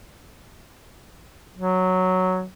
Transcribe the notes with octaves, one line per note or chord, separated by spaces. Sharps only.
F#3